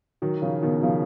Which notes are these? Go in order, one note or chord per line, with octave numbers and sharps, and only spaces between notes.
D#3 F#3
C#3 F3
B2 D#3
C#3 F3